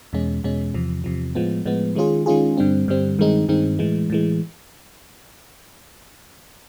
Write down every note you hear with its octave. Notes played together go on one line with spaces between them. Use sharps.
E2 B2 G#3 C#4
E2 B2 G#3 C#4
E2 C3 F3
E2 C3 F3
A2 F3 G#3 B3
A2 F3 G#3 B3
D#3 G#3 C#4 F4 G#4
D#3 G#3 C#4 F4 G#4
G2 D3 G3 C4
G2 D3 G3 C4
G2 D#3 G#3 C4 D#4
G2 D#3 G#3 C4 D#4
A2 E3 G#3
A2 E3 G#3